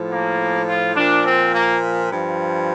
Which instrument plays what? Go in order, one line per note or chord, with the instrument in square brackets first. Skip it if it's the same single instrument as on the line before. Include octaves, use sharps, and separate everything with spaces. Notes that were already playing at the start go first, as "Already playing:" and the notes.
Already playing: [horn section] A2 F3
A#3
F4
A#2 F3 D4
C4
A#3
G2 F3